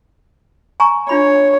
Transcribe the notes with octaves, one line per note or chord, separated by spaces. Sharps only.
G#5 A#5 C#6
D4 F4 C#5 B5